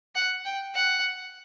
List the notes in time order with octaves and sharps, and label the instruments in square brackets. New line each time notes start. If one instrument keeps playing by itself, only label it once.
[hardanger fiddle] F#5
G5
F#5